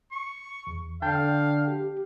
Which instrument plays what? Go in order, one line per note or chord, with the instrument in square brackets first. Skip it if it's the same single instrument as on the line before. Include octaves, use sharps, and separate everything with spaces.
[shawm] C#6
[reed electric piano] E2
[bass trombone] D3 [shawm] F5 [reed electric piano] G5 A5 G6
[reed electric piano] G4